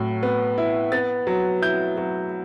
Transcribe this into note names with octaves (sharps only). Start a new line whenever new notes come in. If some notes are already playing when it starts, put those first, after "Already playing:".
Already playing: A2 F#3
B3
E4
B3 A6
F#3
E4 G6
F#3